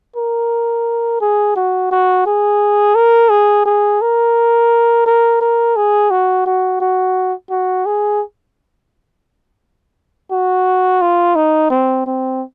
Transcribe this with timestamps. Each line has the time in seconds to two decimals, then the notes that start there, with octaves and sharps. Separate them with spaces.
0.16 A#4
1.21 G#4
1.56 F#4
1.91 F#4
2.26 G#4
2.95 A#4
3.30 G#4
3.65 G#4
4.02 A#4
5.06 A#4
5.41 A#4
5.76 G#4
6.11 F#4
6.46 F#4
6.80 F#4
7.51 F#4
7.86 G#4
10.31 F#4
11.01 F4
11.36 D#4
11.70 C4
12.06 C4